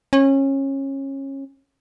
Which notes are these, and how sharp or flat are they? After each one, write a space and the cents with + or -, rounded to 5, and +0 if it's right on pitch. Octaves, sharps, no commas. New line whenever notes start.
C#4 -25